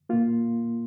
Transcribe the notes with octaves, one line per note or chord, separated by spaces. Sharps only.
A#2 A#3 F4